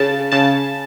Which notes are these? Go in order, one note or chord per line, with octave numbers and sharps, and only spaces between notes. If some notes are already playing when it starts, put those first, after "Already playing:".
Already playing: C#3 A5
C#3 A5